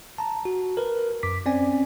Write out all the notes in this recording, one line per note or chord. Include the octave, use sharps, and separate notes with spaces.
A5 A#5
F#4
A#4 B4
F#2 D6 B6
C4 C#4 D5 G#5